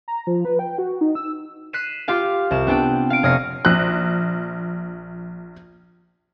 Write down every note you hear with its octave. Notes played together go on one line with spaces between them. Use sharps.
A#5
F3
B4
G5
F#4
D#4
E6
F#6 B6 C7 D#7 E7
F4 G4 F5
C2 E7
B3 C4 D4 G5
F5 D7
F1 C#5 D#6 F6 A#6 C7
A#1 F#6